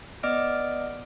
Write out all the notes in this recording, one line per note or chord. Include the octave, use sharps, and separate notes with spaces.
B3 D5 D#5 D6 F6 D7